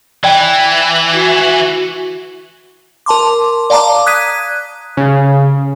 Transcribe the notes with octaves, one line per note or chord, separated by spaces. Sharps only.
E3 D5 G5
F#4
A#4 A5 C6 D6
D5 F5 A5 A#5 D6
D#6 F#6 G#6 B6 D#7
C#3